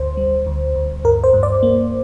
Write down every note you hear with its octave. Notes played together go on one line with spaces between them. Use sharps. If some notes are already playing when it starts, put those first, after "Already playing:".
Already playing: G1 D2 C5
G3
D2
D2
G2 A#4
C5
G2
D5
A#3